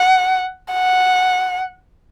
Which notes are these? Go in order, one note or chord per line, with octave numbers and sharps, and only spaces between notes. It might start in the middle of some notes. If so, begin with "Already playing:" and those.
Already playing: F#5
F#5